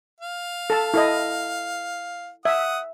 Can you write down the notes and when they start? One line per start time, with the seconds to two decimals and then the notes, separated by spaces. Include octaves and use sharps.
0.20 F5
0.70 A4 A5
0.94 E4 A4 D#5
2.45 E5 F#5 D#6